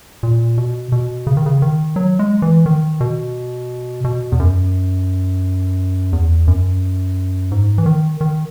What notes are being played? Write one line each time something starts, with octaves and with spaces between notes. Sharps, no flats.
A#2
B2
B2
C#3
D#3
C#3
D#3
F#3
G#3
E3
D#3
B2
B2
E2
F#2
E2
F#2
G#2
E3
D#3
D#3